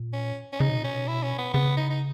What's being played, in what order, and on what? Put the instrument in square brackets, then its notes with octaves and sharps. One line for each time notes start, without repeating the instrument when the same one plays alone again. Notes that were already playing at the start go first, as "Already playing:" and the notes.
Already playing: [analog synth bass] A#2
[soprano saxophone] C#4
C#4
[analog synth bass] C#3 [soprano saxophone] D#4
[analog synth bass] B2
A#2
[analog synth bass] B2 [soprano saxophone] C#4
[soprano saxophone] E4
C#4
B3
[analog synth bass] C#3 [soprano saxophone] B3
[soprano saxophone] D#4
D#4